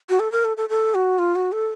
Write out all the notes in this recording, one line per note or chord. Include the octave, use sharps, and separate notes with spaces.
F#4
A4
A#4
A4
A4
A4
F#4
F4
F#4
A4